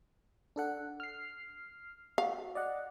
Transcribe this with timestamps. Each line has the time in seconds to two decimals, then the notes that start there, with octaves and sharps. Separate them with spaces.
0.56 D4 A4 F#5
1.00 F6 C7
2.18 F#4 F5
2.55 D5 D#5 F#5